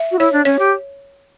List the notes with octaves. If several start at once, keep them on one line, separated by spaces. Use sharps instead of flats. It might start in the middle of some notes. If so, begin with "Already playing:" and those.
Already playing: E5
F#4
E4 C#5
D4
C#4 C#5
G4